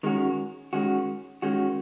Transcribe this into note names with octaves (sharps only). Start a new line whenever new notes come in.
D#3 G#3 C#4 F#4
D#3 G#3 C#4 F#4
D#3 G#3 C#4 F#4